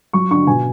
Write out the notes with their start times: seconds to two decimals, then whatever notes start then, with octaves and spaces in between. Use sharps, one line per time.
0.13 F#3 C#6
0.30 D3 C#6
0.47 B2 G#5